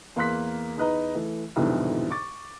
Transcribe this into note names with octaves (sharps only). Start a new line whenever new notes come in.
E2 A#3 A#4 C6 F#6 B6
E2 D#4 B4 D#5 A#5
E3 A3
C2 F2 G#2 B2 D3 E3
C#6 D6 A6